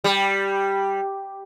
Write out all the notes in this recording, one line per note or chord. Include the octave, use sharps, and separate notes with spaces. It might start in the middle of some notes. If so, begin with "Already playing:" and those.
G3